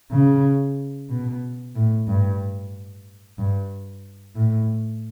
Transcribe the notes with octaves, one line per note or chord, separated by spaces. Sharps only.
C#3
B2
A2
G2
G2
A2